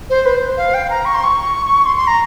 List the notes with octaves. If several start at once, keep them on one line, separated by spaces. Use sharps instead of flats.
C5
B4
C5
F5
G5
A#5
C#6
C6
C#6
C6
C6
A#5